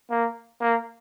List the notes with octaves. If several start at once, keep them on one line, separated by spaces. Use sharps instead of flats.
A#3
A#3